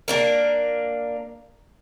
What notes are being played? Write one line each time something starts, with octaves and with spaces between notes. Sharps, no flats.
A#3 D4 A#4